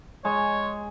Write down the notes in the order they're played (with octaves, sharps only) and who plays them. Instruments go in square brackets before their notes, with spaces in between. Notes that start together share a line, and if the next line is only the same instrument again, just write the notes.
[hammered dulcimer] G#3 [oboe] C#5